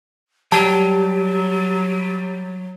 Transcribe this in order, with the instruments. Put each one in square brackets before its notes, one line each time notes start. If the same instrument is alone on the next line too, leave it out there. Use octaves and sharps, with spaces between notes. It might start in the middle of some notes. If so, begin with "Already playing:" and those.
[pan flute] F#3 [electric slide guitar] G3 [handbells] A5